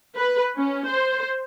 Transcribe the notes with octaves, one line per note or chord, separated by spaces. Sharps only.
B4
C#4
C5